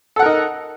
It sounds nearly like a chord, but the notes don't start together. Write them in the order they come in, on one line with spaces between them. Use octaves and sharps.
A4 F#5 A#4 D#4